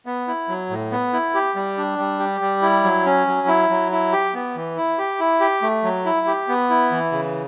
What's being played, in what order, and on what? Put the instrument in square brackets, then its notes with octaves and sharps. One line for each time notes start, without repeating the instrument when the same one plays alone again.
[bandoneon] B3
E4
F#3
A2
B3
E4
G4
G3
D4
G3
G4
G3
E4
F#3
C#4
F#3
E4
F#3
E4
G4
B3
E3
E4
G4
E4
G4
A3
F#3
E4
G4
B3
E4
E3
C#3